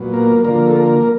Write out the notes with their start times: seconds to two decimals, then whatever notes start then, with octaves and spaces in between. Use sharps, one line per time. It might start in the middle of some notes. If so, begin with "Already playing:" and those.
Already playing: A#2 F#3 B3
0.13 A#3 A#4
0.44 D3 F3 A#3 A#4
0.66 A4
0.76 A#3 A#4